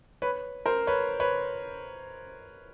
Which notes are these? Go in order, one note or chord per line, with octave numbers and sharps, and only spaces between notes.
B4 C#5
A#4 C5
B4 C#5
B4 C#5